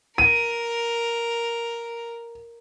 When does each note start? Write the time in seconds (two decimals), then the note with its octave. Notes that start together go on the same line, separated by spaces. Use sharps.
0.18 A#4 D#7